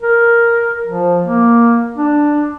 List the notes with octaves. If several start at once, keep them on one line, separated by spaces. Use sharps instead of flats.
A#4
F3
A#3
D4